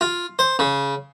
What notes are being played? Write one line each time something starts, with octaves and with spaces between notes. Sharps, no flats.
F4
C5
C#3